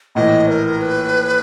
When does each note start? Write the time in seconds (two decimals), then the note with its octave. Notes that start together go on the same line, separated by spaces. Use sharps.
0.15 A#1 A2 E3 D#5
0.48 A#4
0.81 B4